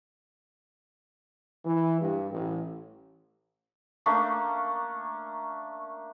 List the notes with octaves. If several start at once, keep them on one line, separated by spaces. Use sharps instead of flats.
E3
G2
A1
A3 A#3 C#4 D4